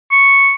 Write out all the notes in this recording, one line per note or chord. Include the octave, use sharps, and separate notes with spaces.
C#6